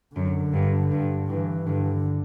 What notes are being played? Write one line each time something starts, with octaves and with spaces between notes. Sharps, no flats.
F#2 D3
G2
G2
G2 E3
G2 D3